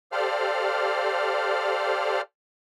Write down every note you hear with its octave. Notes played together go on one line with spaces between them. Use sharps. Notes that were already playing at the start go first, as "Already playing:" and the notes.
G4 A4 C5 D5 F5 F6